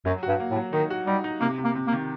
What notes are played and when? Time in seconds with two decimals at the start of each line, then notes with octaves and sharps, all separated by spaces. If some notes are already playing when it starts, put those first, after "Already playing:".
0.05 F#2 F#3
0.23 F#4
0.28 G2
0.40 A#3
0.51 A2
0.56 F#3
0.73 D#3 D#4
0.90 F#4
1.07 G3 D#4
1.24 D#4
1.41 C3 A#3
1.58 C3
1.64 A#3
1.76 C3
1.87 A#3
1.92 D#3